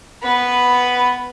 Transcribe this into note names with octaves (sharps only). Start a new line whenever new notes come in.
B3 B4